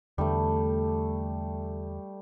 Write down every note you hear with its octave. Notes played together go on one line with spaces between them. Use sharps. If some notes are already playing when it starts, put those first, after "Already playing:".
E2 D3 G3 A3